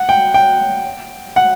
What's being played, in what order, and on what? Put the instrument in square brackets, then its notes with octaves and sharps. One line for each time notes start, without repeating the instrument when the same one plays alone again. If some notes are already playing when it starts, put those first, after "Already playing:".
Already playing: [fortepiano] F#5
G5
G5
F#5